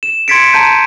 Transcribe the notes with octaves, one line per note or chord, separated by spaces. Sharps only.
E7
C6 G#6 A6 B6 C#7 D7
A5 A#5 G6 D#7